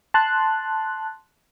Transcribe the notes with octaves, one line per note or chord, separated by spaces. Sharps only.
A5 C6 F#6